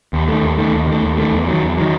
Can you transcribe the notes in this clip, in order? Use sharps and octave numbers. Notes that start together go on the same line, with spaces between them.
D#2
D#3 A3
D#2
D#3 A3
D#2
D#3 A3
D#2
D#3 A3
E2
D#3 F#3
E2
D#3 F#3